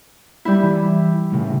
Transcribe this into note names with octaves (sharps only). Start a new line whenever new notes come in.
G3 E4
E3
A2 C#3